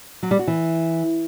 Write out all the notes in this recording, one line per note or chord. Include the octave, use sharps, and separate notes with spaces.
F#3
G3
F#4
E3